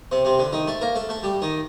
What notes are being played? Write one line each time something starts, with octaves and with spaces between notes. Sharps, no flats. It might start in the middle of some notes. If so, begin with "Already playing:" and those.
C3 C4
C3 C4
D3 D4
D#3 D#4
A3 A4
A#3 A#4
A3 A4
A3 A4
G3 G4
D#3 D#4